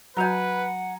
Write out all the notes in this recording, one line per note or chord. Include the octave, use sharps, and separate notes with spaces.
F#3 F#4 B4 F#5 G#5 A#5 G6